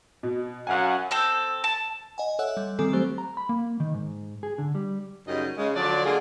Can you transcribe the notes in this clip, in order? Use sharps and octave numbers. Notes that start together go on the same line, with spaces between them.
B2
F#2 F5 F#5 G#5
C4 A4 G6
A5
D#5 F#5 G#5
A4 C#5 E5 F#5 E6 F#6
G3
D#3 G3 C4 A4 G#5 C7
F#3 A3 G4 C5
A#5
B5
A#3
D#3
G#2
G#4
D3
G3
F#2 C#3 G3 D#4 D#5
C#3 G#3
D3 F3 F#3 D5
D3 G#3 A#3 F4 G#4 F#5